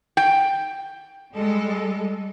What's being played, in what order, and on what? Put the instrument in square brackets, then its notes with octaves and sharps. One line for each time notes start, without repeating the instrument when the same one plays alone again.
[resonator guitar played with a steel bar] G5
[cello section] G3 G#3 A4